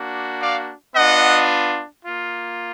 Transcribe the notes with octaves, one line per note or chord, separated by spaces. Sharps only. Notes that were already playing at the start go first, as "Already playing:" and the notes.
Already playing: A#3 D4 F#4
D5 F5
B3 D4 F4 D#5 F#5
A#3 F4